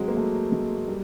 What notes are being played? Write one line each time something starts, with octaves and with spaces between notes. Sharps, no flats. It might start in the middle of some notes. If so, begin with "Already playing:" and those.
Already playing: F#3 G#3 C4
A#3
A3
G#3
G3